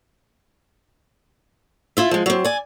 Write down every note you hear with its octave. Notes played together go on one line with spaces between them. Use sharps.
E4 F4 E5
F3 G#3
F#3 C4
D5 G#5